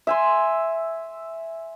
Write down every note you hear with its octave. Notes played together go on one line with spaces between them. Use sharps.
E5 G#5 C6